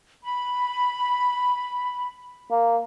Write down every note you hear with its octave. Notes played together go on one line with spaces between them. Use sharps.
B5
A#3